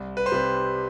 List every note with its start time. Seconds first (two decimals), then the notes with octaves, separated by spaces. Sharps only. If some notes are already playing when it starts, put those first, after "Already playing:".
Already playing: C2
0.17 B4
0.26 C5
0.32 C3 G3 B4